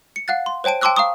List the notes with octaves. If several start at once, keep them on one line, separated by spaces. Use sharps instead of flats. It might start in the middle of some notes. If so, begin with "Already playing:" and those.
C#7
F5 F#5 F#6 A6
C6
C5 C#5 G5 A5 D7
G5 A5 C6 D6 E6 F#6
F5 A#5 C#6 D#6